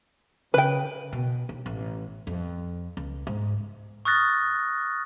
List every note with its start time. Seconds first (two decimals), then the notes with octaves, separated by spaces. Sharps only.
0.54 C#3 B4 G5
1.13 B2
1.49 D#2
1.66 A1
2.27 F2
2.97 C#2
3.27 G#2
4.05 C#6 D#6 F6 F#6 A6 A#6